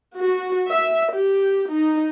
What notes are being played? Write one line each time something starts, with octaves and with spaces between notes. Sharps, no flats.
F#4
E5
G4
D#4